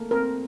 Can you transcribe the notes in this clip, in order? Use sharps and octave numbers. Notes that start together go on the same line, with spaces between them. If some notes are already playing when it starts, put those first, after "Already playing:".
Already playing: A3 A#3
C4 A#4